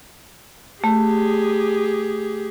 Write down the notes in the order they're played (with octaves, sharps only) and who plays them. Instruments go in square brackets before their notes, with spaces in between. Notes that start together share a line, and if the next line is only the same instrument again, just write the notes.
[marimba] A3 [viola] G4 G#4